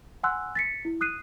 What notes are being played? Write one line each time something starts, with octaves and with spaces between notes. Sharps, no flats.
F#5 G#5 C6 E6 F#6
A6 B6 C#7
E4
D#6 F#6 C7 D#7